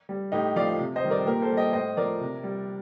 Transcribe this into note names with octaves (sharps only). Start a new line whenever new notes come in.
G3
A2 D#4 G4
F3 D5 F5
C3
C5 D#5
D#3 G3
A#4 D5
A#2 G4 A#4
A4 C5
G3
D#5 G5
A2 C5 D#5
F3 A#4 D5
C3
G3